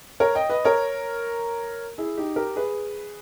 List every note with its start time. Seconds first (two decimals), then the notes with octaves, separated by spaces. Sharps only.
0.20 A#4 C#5
0.35 D#5 G5
0.50 B4 D#5
0.65 A#4 C#5
1.98 E4 G#4
2.17 D#4 G4
2.36 G4 A#4
2.56 G#4 B4